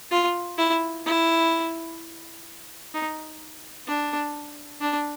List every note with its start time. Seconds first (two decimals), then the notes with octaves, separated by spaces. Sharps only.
0.11 F4
0.58 E4
1.06 E4
2.94 D#4
3.87 D4
4.81 D4